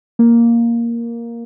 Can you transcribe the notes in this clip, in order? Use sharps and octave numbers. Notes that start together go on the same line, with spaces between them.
A#3